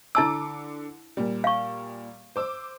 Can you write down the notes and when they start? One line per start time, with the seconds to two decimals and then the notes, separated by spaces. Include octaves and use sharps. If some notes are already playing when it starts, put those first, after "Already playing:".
0.15 D3 E4 A5 D6 E6
1.17 A#2 G3
1.44 F5 C#6
2.36 C5 D6 E6